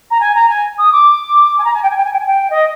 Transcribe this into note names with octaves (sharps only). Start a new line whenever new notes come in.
A#5
G#5
A#5
G#5
D#6
D6
G#5
A#5
G#5
G5
G#5
G5
G#5
G5
G#5
G5
D#5